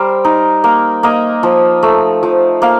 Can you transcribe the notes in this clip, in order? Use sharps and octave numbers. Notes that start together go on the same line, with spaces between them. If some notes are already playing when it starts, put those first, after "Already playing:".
Already playing: G3 A#4 C5
D#4
A#3
A#3 D#5
F3
A3
F3
A#3 F5